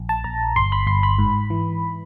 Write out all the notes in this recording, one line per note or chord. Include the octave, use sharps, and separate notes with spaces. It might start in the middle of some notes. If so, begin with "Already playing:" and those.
Already playing: A#1
A5
A#1 A#5
G1 C6
B5
G1 C6
B5
G#2
E3